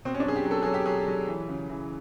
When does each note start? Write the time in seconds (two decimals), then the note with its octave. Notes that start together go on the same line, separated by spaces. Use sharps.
0.05 B2 C4
0.14 C#4
0.20 D4
0.25 F#3 G#4
0.36 G4
0.45 F#3
0.51 A4
0.63 F#3 G#4
0.74 G4
0.86 F#3 G#4
1.08 F#3
1.27 E3
1.49 C#3
1.69 E3